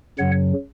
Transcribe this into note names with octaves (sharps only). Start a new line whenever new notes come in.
F#2 C#3 F#3 C#5 F#5